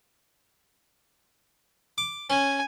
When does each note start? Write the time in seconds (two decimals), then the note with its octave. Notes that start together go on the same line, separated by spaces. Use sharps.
1.98 D6
2.30 C#4 G#5